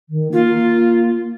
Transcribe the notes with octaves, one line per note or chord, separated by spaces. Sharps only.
D#3
A#3 F4